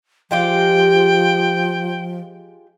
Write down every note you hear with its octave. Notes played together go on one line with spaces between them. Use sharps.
F3 G#3 F4 G4 G5